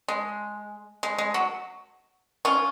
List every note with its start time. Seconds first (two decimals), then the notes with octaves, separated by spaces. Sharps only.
0.08 G#3
1.03 G#3
1.18 G#3
1.34 F#3
2.45 C#4 F4